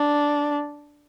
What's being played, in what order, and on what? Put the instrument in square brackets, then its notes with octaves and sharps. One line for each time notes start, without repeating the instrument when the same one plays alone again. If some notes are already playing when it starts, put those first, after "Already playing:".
Already playing: [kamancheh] D4